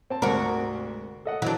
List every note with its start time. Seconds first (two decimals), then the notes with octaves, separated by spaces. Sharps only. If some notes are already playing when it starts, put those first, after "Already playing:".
0.10 C4 A5
0.22 D2 G#2 C3 F#4 A#4
1.25 A4 D#5 F#5
1.42 E3 F#3 D4